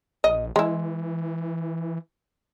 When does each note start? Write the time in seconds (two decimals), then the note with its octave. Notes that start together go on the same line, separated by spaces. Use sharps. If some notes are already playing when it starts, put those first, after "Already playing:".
0.24 A#1 D#5
0.56 E3 G#3 E4